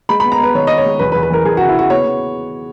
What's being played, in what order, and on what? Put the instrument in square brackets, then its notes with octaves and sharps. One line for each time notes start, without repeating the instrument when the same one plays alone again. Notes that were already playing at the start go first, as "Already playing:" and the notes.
[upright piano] G#3 B5
B3 B5
A#5
B3 B4
D#3 C#5
B3 D#5
C#5
G#3
E2 B4
B4
E2
B4
E3 A#4
E2 G#4
C#3 F#4
E4
C#3 F#4
B3 C#5
B3